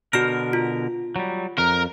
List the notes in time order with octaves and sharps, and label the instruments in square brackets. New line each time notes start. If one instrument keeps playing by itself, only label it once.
[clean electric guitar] B2 D3 A#4 [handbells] F#4 F6
[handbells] F4
[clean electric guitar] F#3 G3
[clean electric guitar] F2 [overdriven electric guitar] A#4